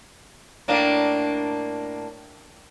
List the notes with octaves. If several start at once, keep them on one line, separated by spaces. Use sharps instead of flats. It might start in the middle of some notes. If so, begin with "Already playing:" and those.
A2 A#3 D4